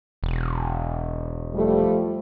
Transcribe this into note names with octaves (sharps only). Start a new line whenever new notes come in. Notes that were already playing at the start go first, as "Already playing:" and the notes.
E1
F3 G3 A3